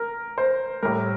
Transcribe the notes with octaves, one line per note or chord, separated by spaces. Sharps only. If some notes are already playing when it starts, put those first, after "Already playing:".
Already playing: A#4
C5
A2 G3 A#4